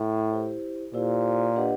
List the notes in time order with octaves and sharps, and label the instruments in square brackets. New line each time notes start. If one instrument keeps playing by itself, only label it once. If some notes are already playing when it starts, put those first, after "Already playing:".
Already playing: [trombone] A2
[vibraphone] E4 G4 C5
[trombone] A#2 [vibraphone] E4 G4 C5
[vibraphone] D4 G4 B4 D#5 F#5